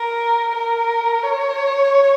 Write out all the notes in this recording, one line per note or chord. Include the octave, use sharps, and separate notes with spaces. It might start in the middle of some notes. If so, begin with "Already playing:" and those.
Already playing: A#4
A#4
C#5